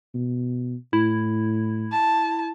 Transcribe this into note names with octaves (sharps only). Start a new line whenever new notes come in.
B2
A2 E4
A5